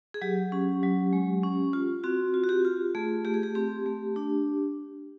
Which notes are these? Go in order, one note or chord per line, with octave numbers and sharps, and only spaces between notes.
G#4
F#3 G4
C#4
F#3
G#3
C#4
F4
C4 F#4
F4
F#4
G4
F4
A3 G#4
A3 G4
G#4
G4
C4 G4
A3
D4